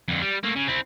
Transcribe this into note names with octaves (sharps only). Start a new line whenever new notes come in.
F2 D3
G3
A3 A#3
C#3
C4 E4